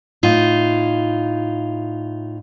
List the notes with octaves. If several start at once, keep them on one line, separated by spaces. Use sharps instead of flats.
A2 D#4 F4